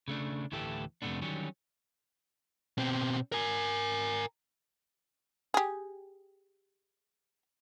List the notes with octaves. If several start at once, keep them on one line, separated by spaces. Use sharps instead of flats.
C#3 A3 D4
D2 A2 E3 A3 G4 A4
F2 C3 D#3 A3 B3 D4
D3 D#3 F#3 G3 C#4
B2 C4
A#4 G#5
G4 G#4